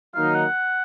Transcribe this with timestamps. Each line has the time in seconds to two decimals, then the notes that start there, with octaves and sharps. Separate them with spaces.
0.15 D#3 F#3 A#3 D#4 F5
0.35 F#5